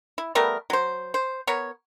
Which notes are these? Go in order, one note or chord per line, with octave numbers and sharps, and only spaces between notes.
E4
G3 A3 B3 A#4
F#3 C5
C5
B3 A#4 C#5